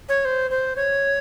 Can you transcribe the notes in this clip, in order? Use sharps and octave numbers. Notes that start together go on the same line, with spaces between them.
C#5
C5
C5
C#5